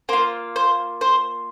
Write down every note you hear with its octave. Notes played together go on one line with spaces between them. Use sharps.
A#3 F4 C5
C5
C5